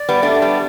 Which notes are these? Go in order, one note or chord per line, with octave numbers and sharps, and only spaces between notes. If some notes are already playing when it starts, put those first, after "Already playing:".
Already playing: D5
G3 B3
A3 D4
G3 B3